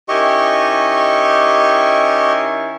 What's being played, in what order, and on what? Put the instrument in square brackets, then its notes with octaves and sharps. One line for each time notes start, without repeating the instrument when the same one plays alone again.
[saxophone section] D#3 C#4 E4 [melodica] G4 D#5 C#6